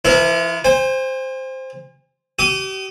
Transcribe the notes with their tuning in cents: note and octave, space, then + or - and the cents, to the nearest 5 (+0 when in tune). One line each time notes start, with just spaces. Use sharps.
F3 -35 E4 +0 A#4 +35
C5 +0 G#5 -45
G4 -40 D#6 +0